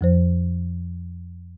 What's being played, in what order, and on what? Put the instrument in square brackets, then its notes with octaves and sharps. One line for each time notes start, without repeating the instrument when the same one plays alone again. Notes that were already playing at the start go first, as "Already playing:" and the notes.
[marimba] F2 F3 C5